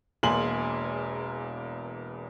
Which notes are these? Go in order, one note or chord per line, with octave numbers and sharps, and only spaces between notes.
E1 E2 A#3 G#5 C6 F#7